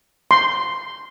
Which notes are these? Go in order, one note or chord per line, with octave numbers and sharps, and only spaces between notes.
C6